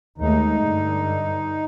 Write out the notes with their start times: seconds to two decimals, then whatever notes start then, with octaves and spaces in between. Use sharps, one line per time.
0.18 D#2 G#3 A3 D#4
0.62 G2 D3